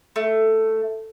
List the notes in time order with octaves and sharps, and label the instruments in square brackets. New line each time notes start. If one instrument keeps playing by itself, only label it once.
[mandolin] A3